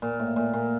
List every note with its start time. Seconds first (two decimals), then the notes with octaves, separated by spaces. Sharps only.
0.02 A#2
0.19 A2
0.36 A#2
0.53 A#2